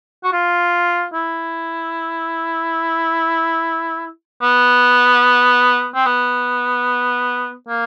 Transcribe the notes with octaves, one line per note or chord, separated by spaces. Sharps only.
F#4
F4
E4
B3
C4
B3
A#3